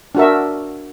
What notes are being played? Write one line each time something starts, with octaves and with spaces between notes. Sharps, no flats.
D4 F#4 A#4 E5